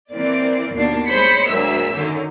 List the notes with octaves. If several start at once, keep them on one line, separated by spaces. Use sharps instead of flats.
E3 A#3 C4 D5
D#2 B2 A#3 D4 C7
G#3 C5 C#5 B5 B6 C#7
D2 F#3 G#3 A#3 E5 E6
F#2 D3 D#3